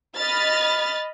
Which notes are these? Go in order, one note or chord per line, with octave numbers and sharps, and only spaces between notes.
D#5 B5 F6 A6